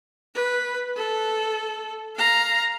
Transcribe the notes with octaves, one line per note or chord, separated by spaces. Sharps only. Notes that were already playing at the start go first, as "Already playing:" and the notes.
B4
A4
F5 A#5